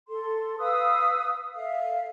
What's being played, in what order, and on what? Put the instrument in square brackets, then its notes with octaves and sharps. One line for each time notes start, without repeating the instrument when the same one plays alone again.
[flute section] A4 C6
B4 F5 D#6 E6
A4 E5 F5